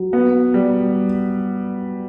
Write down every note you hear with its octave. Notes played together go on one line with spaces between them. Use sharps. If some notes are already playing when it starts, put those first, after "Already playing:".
Already playing: F#3
B3
G3